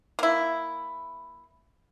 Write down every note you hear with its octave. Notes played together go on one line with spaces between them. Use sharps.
A#3 E4